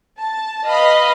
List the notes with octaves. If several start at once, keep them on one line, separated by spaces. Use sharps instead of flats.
A5
B4 D#5 F5 B5